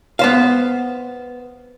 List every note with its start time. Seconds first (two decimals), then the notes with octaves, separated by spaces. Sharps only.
0.19 B3 C5 F5